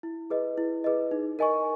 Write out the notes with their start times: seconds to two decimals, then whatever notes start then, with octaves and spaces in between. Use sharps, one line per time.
0.03 E4
0.30 G#4 B4 D#5
0.58 E4
0.84 G#4 B4 D#5
1.11 D#4
1.39 A#4 D#5 G#5 C#6